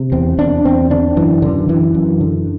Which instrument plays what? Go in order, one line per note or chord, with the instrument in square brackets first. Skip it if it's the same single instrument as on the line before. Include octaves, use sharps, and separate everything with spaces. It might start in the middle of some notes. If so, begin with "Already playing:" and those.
Already playing: [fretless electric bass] C3
E2 C4
E2 D4
E2 C4
D3 D4
F#2 E3
F#2 D3
D3 E3
F#2
D3